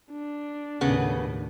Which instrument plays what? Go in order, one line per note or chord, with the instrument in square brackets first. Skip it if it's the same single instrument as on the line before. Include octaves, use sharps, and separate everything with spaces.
[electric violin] D4
[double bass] D#2 A2 [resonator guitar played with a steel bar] C#3 B3